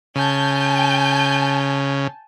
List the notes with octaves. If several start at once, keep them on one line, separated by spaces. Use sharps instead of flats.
C#3 G#5 A5 G6